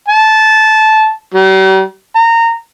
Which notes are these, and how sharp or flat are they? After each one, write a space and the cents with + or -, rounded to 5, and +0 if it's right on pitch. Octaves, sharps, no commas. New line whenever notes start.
A5 -15
G3 -45
A#5 -20